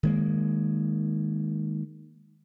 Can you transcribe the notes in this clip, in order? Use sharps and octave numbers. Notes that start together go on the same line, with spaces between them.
D#3 G#3 A#3